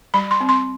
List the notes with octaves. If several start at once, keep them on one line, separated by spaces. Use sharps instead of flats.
G3 B5
C6
C4
C6